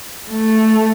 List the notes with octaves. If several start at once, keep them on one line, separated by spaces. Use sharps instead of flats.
A3